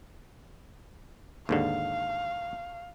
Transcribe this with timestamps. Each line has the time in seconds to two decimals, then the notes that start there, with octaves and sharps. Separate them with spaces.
1.49 D#2 G#2 D3 F5